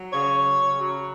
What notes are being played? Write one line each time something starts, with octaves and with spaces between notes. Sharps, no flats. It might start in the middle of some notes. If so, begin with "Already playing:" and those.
Already playing: F#3
C#3 C#5
F#3
C#3
F#3